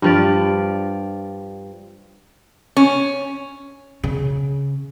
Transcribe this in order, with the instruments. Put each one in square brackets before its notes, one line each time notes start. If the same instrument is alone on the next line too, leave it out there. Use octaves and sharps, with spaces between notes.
[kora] G2 F3 D5
[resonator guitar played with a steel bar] C#4
[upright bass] C#3